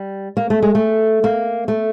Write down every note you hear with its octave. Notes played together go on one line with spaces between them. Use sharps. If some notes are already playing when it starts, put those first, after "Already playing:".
Already playing: G3
A#3
A3
G#3
A3
A#3
A3